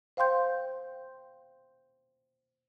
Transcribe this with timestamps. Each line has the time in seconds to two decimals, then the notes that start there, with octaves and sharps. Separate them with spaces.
0.17 C5 F5 G5 C6 G6